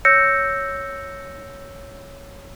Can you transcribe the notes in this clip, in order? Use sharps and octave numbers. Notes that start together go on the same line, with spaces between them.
C#5 E6 G6 A#6 C#7